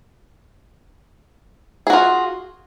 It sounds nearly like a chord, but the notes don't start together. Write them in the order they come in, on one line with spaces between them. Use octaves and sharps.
G#4 F#4 F4